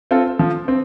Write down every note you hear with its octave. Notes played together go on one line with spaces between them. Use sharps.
C4 F4 A4
F3
C4